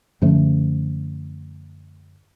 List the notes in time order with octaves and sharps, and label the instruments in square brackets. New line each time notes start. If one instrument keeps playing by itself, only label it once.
[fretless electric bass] F#2 D3 F3 A3